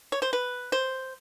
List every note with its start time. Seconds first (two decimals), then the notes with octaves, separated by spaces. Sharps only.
0.12 C#5
0.22 C5
0.33 B4
0.72 C5